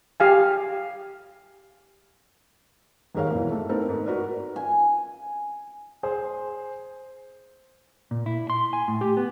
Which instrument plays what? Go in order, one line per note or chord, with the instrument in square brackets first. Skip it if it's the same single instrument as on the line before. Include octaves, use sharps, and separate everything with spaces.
[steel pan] G4 F5 G#5
[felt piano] D#2 G#2 G#4 A#4 C#5 F5
B2 E3 A#3
A3
B3 C4 D#4 A4 A#4
G#2
F#4 A#4 B4 D5
[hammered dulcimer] G#5
[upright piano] G#4 C5
[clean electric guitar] A#2
E4
C6
G#5
A2
G4
B3